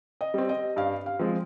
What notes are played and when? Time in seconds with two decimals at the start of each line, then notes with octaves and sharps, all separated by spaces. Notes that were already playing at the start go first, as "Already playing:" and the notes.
0.21 D#5
0.34 G3 C4
0.49 D#5
0.76 G2 F5
1.06 F5
1.19 F3 G#3 C4